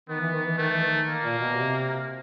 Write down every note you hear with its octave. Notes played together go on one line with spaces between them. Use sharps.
D#3 B3
E3
D#3
E3
D#3 A3
E3
D#3
A#3
A#2
B2
C3